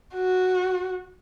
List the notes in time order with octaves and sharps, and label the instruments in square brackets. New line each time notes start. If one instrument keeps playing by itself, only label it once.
[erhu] F#4